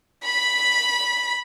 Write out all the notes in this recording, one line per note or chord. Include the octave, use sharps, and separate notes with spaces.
B5 B6